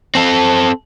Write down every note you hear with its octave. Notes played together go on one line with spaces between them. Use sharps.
C4 A4